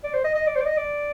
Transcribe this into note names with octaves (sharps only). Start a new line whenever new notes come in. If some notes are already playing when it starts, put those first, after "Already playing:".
D5
C5
D#5
D#5
D5
C5
D5
D#5
D5